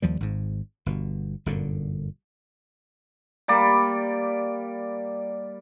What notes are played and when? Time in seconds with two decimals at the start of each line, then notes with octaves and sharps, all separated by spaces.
0.02 D#2 F3 G3
0.20 G#1 G#2
0.86 G1 B2
1.46 G1 F#2 A#2 D3
3.48 G3 A#3 D5